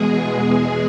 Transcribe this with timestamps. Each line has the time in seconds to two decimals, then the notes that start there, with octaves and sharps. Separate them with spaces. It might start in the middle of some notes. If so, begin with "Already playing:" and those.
Already playing: E2 B2 G#3 G#4
0.27 G#4